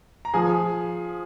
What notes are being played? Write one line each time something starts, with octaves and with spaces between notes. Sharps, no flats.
A#5
F3 G#4 G#5